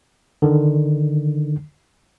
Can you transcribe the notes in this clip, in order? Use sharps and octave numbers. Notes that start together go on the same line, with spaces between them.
D3 D#3